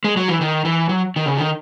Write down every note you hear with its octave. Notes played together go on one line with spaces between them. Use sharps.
G#3
F#3
E3
D#3
E3
F#3
D#3
C#3
D#3